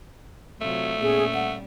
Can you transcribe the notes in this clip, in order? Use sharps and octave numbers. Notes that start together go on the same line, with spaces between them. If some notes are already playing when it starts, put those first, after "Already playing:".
C3 F#3 A3 F4
A#2 B3 C#4 G#4
G3 F#5